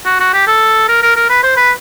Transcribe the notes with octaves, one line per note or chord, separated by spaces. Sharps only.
F#4
F#4
G4
A4
A#4
A#4
A#4
B4
C5
B4